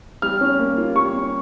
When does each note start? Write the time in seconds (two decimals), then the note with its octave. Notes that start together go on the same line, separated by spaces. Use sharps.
0.22 G3 F6
0.41 C#4
0.59 A#3
0.77 F4
0.95 G3 C#6
1.14 C#4